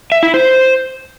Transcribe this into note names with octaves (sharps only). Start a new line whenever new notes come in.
E5
E4
C5